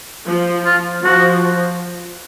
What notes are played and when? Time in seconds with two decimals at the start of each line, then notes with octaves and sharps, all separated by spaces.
0.27 F3
0.65 F4
1.03 F3 F#4